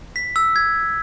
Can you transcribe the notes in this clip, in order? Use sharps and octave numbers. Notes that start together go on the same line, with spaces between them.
B6
E6
G#6